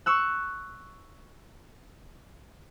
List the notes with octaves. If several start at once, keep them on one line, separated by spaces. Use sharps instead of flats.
C#6 E6 F#6